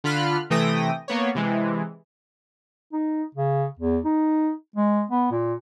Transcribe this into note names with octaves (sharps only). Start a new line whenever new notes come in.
D3 F4 B5 F6 F#6
C3 E3 A3 G5 D#6 A#6
A#3 B3 C#5
C3 E3 G#3
D#4
C#3
E2
D#4
G#3
B3
A#2